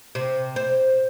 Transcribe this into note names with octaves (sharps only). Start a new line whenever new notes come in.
C3
C5